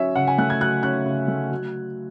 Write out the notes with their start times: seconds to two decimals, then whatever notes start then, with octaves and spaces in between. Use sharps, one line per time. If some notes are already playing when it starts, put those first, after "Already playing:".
Already playing: F#3 C#4 E5
0.15 C#3 F#5
0.27 G#5
0.38 A3 F#6
0.50 G#6
0.61 F#3 F#6
0.83 C#4 F#6
1.06 C#3
1.28 A3
1.51 F#3